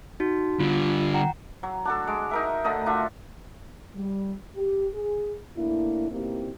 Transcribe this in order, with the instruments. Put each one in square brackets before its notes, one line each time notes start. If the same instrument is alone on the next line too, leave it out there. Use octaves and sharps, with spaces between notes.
[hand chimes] D#4 F#4
[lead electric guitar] D3 G3 [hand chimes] F4
[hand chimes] F#5 G5 A#5
[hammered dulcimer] F#3
D4 F#4 A4
G#3
D#4 A#4 E5
D3 A3 D#4 D#5
D4 F4 F#4 E5
[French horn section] G3
G4
G#4
A2 A#3 D4 E4
B2 A#3 C4 D#4 E4 G4